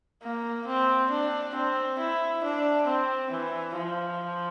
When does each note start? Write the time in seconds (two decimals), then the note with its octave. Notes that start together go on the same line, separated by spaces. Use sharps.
0.23 A#3
0.66 C4
1.10 D4
1.55 C4
1.99 E4
2.44 D4
2.87 C4
3.31 E3
3.76 F3